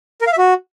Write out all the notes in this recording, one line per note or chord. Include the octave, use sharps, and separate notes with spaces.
A#4
F5
E5
F#4